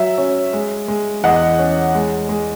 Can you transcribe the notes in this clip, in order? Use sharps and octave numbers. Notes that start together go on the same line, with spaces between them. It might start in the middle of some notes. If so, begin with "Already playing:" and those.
Already playing: F#3 E5
C#4
G#3
G#3
E2 D#5 F#5
C#4
G#3
G#3